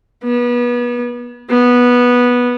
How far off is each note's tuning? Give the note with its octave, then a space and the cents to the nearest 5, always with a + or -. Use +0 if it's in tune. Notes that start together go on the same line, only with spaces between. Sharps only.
B3 -30
B3 -10